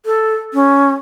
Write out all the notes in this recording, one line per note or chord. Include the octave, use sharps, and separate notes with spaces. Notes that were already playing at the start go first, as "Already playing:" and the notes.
A4
C#4